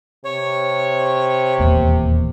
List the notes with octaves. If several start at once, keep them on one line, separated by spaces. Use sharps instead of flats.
C3 C#5
D#1 E2 A#3